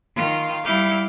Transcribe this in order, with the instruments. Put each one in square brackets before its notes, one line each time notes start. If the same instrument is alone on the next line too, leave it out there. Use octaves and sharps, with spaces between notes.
[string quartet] D#3 F4
G3 E4 F5 D6 G6